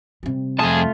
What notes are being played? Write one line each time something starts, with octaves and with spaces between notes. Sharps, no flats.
C3 G3
F2 A3 F4 G#4 A5